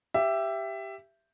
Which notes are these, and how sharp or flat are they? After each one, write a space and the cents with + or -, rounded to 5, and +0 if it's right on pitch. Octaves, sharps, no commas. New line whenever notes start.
G4 +0 E5 +15